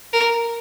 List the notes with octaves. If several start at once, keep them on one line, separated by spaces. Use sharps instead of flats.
A#4